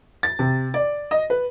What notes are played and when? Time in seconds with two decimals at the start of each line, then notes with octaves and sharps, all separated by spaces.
0.23 A6
0.39 C3
0.74 D5
1.11 D#5
1.30 B4